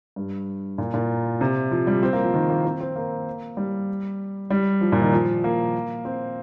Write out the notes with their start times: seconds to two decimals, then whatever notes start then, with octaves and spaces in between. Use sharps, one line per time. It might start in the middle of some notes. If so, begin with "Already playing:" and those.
0.16 G2
0.78 A#2
0.94 A#2
1.41 C3
1.71 F3
1.87 G3
2.03 C4
2.13 A#3
2.23 F3
2.34 D#3
2.50 A#3
2.65 C4
2.81 C4
2.96 A#3
3.57 G3
4.50 G3
4.81 F3
4.92 A#2
5.02 D#3
5.13 F3
5.44 A#3
6.05 C4